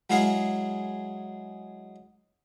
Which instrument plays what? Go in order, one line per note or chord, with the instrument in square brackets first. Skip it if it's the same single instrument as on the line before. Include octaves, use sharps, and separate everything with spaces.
[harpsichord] F#3 G#3 E4 G#4 F5 F#5